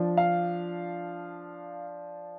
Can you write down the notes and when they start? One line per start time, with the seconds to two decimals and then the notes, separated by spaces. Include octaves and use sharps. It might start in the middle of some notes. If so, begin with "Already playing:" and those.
Already playing: F3 D4
0.17 F5